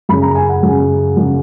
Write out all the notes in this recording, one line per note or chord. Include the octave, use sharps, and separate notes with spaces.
F#2 C#3 B5
A#5
G#5
F#5
F#2 C#3
F#2 C#3